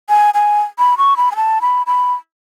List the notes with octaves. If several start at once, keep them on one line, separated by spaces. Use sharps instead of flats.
G#5
G#5
B5
C#6
B5
G#5
A5
B5
B5